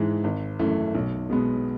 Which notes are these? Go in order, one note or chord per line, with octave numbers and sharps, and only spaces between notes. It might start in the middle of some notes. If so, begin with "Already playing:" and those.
Already playing: G#2 E3 G#3
G#1
F#2 E3 A3
B1
B2 G#3 B3